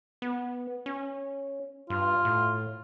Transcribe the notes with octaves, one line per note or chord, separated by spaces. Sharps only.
B3
C#4
G2 F4
A2